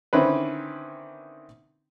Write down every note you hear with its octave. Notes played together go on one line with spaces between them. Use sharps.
D3 D#3 C4 C#4 E4 B4